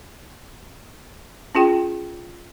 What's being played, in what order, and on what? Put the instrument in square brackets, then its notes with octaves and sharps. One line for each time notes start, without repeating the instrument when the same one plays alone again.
[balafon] C#4 F4 G#4 G5